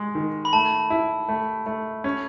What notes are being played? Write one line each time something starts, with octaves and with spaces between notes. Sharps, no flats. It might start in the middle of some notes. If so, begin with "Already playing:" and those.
Already playing: G#3
D#3
B5
A3 A5
E4
A3
A3
C#4